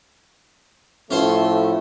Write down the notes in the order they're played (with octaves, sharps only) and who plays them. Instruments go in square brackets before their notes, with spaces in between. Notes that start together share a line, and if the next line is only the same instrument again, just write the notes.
[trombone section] A2 F3 A3 [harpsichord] C#4 C5 C6